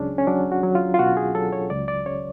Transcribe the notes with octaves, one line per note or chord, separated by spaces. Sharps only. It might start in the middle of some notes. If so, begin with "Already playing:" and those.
Already playing: C#2 F#3 C#4 D4 G#4
C#4
F#3 D4
F#4
F#3
F4
F4
B2 F#4
G#4
F#3 A4
C#5
C#2 D5
D5
C#3 C#5